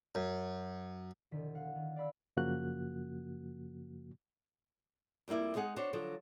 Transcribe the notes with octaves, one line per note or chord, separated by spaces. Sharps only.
F#2
E1 D3 D#3 D4 B6
F5 F#5
D#3
D5 F5 B5 E6
F#2 C#3 F3 A#3 F#4 F#6
F2 G3 A#3 E4 D5
G#3 D#4 G#4 F#5
D4 F#4 C5 C#5
D3 F3 F#3